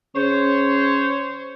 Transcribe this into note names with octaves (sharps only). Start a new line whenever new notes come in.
C#3 C5 C#5